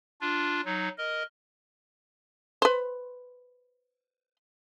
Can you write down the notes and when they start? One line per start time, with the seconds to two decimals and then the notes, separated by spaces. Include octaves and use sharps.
0.21 D4 F4
0.65 F#3 D#4
0.98 A#4 D#5
2.62 B4 C5